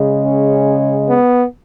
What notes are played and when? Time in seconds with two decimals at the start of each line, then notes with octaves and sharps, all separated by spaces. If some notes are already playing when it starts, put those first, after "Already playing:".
Already playing: C#3 G#3
0.24 C#4
1.07 B3